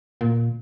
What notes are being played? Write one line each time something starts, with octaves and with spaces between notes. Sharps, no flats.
A#2